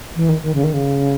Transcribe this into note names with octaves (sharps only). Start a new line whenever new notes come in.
E3
D#3
D#3
C#3
D#3
C#3